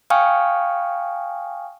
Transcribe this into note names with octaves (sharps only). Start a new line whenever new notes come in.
F5 G5 G#5 C#6 D#6 F6